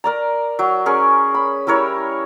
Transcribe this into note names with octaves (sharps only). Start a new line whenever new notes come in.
A#4 D5 A#5
F#3
C#4 G#4 A#4 C#6
B5
G3 E4 A#4 C#5